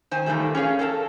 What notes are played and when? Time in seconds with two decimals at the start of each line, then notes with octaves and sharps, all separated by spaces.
0.11 D#3 C5 G#5
0.26 A#2 D#3 E3 G3 A3 A4
0.55 C#4 G#4 C#5 F5
0.79 A4 A#4 F#5 A5